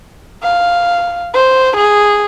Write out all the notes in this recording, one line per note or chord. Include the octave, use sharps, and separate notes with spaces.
F5
C5
G#4